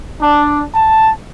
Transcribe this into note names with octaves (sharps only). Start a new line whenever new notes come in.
D4
A5